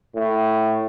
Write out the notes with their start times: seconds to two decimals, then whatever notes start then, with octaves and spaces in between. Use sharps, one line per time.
0.16 A2